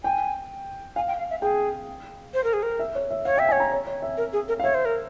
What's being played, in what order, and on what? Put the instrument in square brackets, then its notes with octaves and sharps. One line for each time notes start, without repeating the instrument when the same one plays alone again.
[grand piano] G5 [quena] G#5
[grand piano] F5 [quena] G#5
[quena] G5
F5
E5
[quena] G#4 [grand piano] G5
[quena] C5
A#4
G#4
A#4
[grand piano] E5
C#5
E5
[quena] C#5 [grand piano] F5
[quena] E5 [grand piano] G5
[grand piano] G#5
[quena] C#5
[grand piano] A#5
C#5
C#5
E5
[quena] A#4
G#4
A#4
[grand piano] F5
[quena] C#5 [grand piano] E5
[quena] C5
A#4